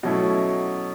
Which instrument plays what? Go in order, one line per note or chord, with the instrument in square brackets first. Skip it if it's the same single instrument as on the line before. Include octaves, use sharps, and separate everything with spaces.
[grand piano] B2 F#3 A3 C#4 E4